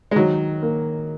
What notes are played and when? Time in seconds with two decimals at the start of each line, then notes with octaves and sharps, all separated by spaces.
0.11 G#3
0.16 D#3 F#3
0.63 A#3